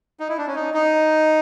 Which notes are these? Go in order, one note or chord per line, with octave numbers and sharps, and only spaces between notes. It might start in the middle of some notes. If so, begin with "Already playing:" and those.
D#4
E4
D4
C#4
D#4
D#4